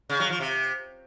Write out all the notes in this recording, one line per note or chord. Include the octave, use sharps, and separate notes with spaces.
C#3
F#3
F3
C3